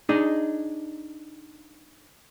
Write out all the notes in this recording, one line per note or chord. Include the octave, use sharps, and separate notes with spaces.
D4 D#4 G#4 D#5